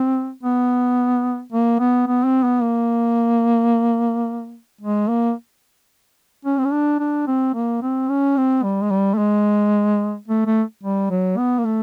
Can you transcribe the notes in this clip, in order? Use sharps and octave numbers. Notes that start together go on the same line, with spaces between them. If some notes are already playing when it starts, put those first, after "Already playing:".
Already playing: C4
B3
A#3
B3
B3
C4
B3
A#3
G#3
A#3
C#4
C4
C#4
D4
D4
C4
A#3
C4
C#4
C4
G3
G#3
G3
A3
G#3
A3
A3
G3
F#3
B3
A#3
A3